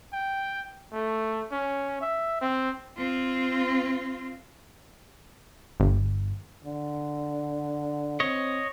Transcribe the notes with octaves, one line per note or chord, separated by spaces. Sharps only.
G5
A3
C#4
E5
C4
C4 F4
G1
D3
C4 C#5 D#5